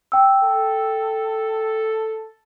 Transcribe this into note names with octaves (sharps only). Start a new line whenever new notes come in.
G5 E6
A4